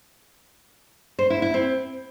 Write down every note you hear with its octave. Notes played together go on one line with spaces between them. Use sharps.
C5
E4
E4
C4